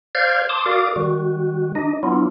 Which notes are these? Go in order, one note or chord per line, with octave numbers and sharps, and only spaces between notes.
C5 D5 F5 F6 G6 G#6
A5 C6 D6 D#6
F#4 A#4 D5 F5 D6 D#6
D#3 G3 F#4
D4 D#4 D#5
F#3 B3 D4 E4 F4